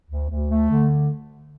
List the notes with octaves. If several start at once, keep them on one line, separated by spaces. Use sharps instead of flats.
D2
D2
A3
D3